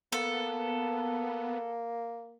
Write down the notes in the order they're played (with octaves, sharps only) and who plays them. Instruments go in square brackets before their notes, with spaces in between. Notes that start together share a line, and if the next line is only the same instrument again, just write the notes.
[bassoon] A#3 [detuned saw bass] B3 [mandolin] A4